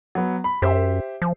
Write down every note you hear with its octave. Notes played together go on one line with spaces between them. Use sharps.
F#3 B3
B5
F#2 G4 C5 E5
F3